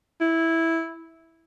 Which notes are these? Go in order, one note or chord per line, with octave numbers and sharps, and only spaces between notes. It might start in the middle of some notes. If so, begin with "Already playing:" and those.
E4